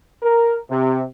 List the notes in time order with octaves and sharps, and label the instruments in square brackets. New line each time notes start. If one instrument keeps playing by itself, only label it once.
[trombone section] A#4
C3